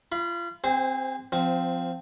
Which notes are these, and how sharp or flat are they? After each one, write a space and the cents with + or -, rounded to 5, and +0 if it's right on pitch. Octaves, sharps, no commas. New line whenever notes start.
F4 -30 B5 +0
C4 +0 G#4 -35 C5 -15
F3 +0 C4 -15